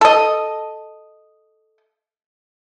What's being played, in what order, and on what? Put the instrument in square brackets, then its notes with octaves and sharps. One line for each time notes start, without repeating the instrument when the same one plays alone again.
[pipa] A4 D#5